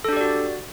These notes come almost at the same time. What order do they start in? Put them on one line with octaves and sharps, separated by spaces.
A4 D4 G4 D5 F#4